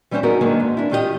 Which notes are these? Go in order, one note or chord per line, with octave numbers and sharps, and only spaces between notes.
E3 G3 C#4 D4 C5 C#5
B3 D#4 F#4 G#4 A#4
D3 D#3 F#3 G#3 A#3 B3
G#2
D4 E4
A2 D#3 F4 G4 B4 D#5